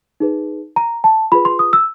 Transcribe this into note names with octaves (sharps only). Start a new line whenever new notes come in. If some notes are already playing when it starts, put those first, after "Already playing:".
D#4 G#4 B4
A#5
A5
F4 G#4 B4 B5
C6
D#6
E6